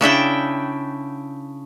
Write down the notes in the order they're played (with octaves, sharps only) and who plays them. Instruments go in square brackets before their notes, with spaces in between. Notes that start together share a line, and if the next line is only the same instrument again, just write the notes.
[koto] C#3 D4 E4 G5